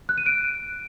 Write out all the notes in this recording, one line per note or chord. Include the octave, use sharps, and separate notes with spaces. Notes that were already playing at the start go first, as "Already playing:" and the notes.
F#6
D#7
D7